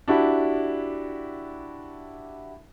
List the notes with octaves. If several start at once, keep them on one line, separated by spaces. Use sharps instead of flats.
D4 E4 F#4 G4